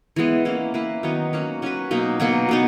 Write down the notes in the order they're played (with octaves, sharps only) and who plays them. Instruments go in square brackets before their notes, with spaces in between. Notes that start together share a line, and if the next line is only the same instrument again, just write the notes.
[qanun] E3 G#3 B3
A#3 C#4 E4
A#3 E4 B4
D#3 F#3 B3 D#4
A#3 C#4 F#4
F#3 C#4 F#4 B4
B2 F#3 A#3 D#4
B2 F#3 A#3
F#3 B3 D#4